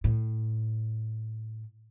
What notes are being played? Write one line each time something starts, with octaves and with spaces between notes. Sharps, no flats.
A2